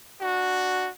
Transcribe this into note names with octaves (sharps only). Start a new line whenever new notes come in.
D4 F#4